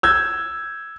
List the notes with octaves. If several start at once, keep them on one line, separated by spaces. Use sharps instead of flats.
E6 G6 G#6